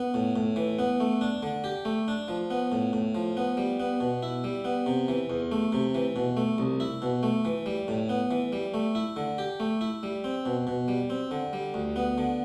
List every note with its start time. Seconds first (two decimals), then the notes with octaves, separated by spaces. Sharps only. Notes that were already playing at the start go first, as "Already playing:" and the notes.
Already playing: B3
0.14 A2
0.36 A2
0.56 E3
0.79 B3
1.00 A3
1.21 D4
1.43 D3
1.64 G4
1.85 A3
2.08 D4
2.28 F3
2.50 B3
2.72 A2
2.93 A2
3.15 F3
3.37 B3
3.57 G3
3.80 B3
4.00 B2
4.23 E4
4.44 G3
4.65 B3
4.86 C3
5.08 E3
5.30 E2
5.52 A3
5.72 C3
5.95 E3
6.16 B2
6.37 A3
6.58 C2
6.80 E4
7.02 B2
7.23 A3
7.45 E3
7.66 G3
7.88 A2
8.09 B3
8.31 E3
8.52 G3
8.74 A3
8.95 E4
9.16 D3
9.38 G4
9.60 A3
9.81 E4
10.03 G3
10.24 C4
10.46 B2
10.67 B2
10.88 G3
11.10 C4
11.31 D3
11.53 G3
11.74 D2
11.96 B3
12.18 D3